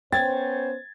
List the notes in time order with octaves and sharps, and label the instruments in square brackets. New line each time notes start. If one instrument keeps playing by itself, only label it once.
[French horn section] B3 C#4 C5 [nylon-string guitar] G5 [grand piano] G#6 A6